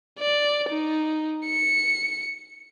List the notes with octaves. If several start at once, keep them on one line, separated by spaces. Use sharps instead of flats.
D5
D#4
C#7